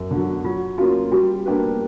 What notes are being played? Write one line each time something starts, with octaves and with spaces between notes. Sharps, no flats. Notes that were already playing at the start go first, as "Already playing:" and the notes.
Already playing: F#2
D3
F#3
F#3 F4
A#3 C#4 F4 F#4
G3 F#4
A#3 D4 G4 B4